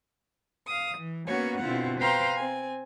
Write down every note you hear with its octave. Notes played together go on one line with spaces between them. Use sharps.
F5 D#6
E3
A#3 B3 C#4 F#4 B4 C#5
B2 D3 C4 E4 F4 F#5
B4 C5 F5 G5 A#5 C6
C4 G#5